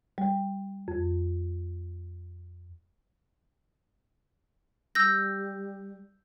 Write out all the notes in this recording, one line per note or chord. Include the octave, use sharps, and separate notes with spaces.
G3
F2
G3 E6 G6 A#6